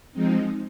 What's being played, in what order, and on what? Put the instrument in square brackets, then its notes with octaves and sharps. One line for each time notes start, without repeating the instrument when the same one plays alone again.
[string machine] F3 G#3 C4 D#4